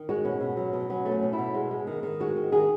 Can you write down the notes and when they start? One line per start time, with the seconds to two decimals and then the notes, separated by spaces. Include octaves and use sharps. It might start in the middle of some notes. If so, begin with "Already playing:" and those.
Already playing: D#3
0.09 G#3 F#4
0.25 B2 C#4
0.40 B2
0.57 F#3
0.73 B2
0.90 F#3 C#4
1.06 A3
1.11 C#4
1.23 B2
1.33 E4
1.38 B2
1.55 G#3
1.71 G#3
1.87 D#3
2.03 D#3
2.20 G#3 F#4
2.36 D#3
2.52 D#3 G#4